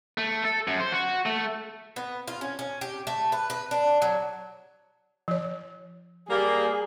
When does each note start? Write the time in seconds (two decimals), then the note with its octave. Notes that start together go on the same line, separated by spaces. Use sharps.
0.18 A3
0.45 A4
0.68 F#2
0.80 C5
0.92 F#4
1.26 A3
1.96 B3
2.27 F4
2.41 C#4
2.59 C#4
2.81 G4
3.07 A3
3.32 B4
3.50 B4
3.71 D4
4.02 F#3
5.28 F3 C#5
6.30 G3 A#3 G#4